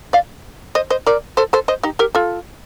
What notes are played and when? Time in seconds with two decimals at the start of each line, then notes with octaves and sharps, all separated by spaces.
0.13 D5 F5
0.75 C5 D#5
0.90 C5 D#5
1.06 A#4 D5
1.37 A4 C5
1.53 A4 C5
1.68 C5 D#5
1.83 D#4 G4
1.99 G4 A#4
2.15 F4 A4